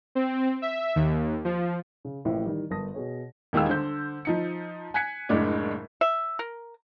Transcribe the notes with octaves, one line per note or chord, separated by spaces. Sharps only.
C4
E5
D#2
F3
C#3
A1 A2 F3 A#3 C5 E5
D#3 E3 G3
G1 A#4 A5 D#6 A#6
B2 G#4 C#5
D#1 D#3 G3 G#3 F5 E6
D3 C5 G6
F3 D#4 C#7
G#5 F#6 G#6 B6 C#7
F#1 A2 G#3 D4 D5
E5
A#4